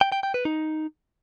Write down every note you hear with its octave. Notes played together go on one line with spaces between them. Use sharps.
G5
G5
G5
B4
D#4